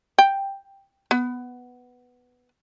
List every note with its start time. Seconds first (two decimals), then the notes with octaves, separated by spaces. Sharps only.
0.18 G5
1.11 B3